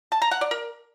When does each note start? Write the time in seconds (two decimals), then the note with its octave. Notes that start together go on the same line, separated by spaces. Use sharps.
0.12 A5
0.22 A#5
0.31 F#5
0.41 D5
0.51 A#4